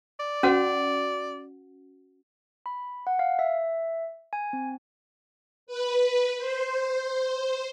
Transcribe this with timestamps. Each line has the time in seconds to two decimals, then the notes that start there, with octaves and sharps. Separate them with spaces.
0.20 D5
0.43 C#4 F#4 F#5
2.66 B5
3.07 F#5
3.19 F5
3.39 E5
4.33 G#5
4.53 C4
5.67 B4
6.38 C5